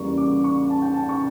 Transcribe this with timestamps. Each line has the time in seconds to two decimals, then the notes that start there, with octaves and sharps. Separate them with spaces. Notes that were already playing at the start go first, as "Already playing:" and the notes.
Already playing: E2 C#3 G3 A#3 C#6
0.18 D6
0.44 C#6
0.70 A5
0.82 G5
0.94 A5
1.09 C#6